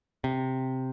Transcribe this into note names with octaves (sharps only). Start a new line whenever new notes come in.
C3